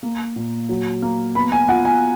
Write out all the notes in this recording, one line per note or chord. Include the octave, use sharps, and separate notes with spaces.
A#3
A#2
F#3
A#3
B3 B5
G#5
F4 F#5
G#5